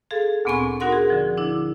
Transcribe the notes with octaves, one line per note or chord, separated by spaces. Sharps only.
G#4 A4 F5
D2 A#2 B3 C4 G#5 C#6
D#4 F#4 A#4 F#5 C6
G#4
D3 F3
D4 E4